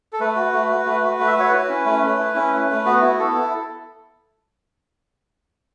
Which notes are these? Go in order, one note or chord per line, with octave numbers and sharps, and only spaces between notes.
A4
A3 B4
F#4
A3
F#4
A3
F#4
A3
E5
F#4 C#5
E4 B4
C#4
A3
A3
E4
C#4
A3
A3
B3 F#4
E4
B3 A4
E4